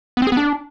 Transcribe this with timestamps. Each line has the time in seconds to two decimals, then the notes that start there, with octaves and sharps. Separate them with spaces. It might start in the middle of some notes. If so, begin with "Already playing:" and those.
0.17 B3
0.22 C4
0.27 G#4
0.32 B3
0.37 D4